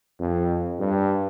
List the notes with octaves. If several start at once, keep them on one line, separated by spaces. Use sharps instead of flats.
F2
G2